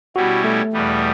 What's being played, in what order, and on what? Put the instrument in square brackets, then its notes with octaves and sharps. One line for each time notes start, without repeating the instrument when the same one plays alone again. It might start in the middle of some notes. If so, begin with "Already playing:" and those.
[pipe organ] B2 G3 C#4 E4 [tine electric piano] F#4
[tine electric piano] A3
[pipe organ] E2 B2 G3 B3